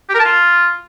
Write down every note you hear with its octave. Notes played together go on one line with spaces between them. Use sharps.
G4
A#4
A5
F4